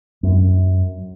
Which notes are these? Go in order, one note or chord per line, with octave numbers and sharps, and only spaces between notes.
F#2